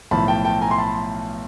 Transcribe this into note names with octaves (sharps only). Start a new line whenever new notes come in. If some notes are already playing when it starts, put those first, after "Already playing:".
B1 A2 F3 A5 B5
G5 A5
G5 A5
G#5 A#5
C6
A5 B5